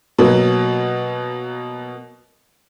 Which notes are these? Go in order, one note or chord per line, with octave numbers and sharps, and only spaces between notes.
B2 F#3 A#3